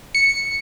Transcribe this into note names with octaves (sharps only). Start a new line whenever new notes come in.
C#7